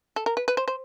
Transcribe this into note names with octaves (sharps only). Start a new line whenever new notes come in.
A4
A#4
B4
B4
C5
C5